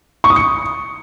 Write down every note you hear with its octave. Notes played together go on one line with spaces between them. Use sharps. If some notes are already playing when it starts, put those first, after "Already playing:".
C#6
D#6
C#7